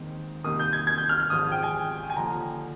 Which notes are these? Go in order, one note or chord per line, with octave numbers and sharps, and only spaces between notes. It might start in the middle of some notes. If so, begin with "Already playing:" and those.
Already playing: D#2 D#3 G#3 C4
C2 C3 D#3 A#3 D#6
G6
G#6
G#6
G6
F6
F6
G#1 G#2 F3 D#6
G5
G#5
G#5
D#2 D3 F3 A#5